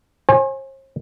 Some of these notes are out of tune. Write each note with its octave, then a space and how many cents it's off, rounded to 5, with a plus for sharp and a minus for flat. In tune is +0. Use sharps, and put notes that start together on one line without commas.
C5 +45 G#5 +0